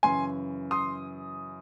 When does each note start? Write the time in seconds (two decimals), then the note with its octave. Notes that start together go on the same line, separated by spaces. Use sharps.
0.03 F#2 C#3 E3 G#5 C6
0.71 C6 D#6